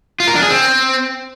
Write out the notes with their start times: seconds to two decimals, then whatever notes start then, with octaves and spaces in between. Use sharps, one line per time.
0.20 F4
0.28 A#4
0.35 D4
0.43 G#4
0.50 C4